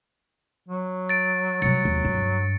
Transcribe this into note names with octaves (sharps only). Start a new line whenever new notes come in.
F#3
A6 D7
C3 F#3 G3 A6 C#7
D#2
G2